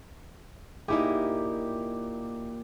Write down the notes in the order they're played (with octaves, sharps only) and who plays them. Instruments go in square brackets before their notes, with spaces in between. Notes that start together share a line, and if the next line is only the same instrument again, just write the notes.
[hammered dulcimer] A#2 G4 [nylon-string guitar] D#4 E4 G#4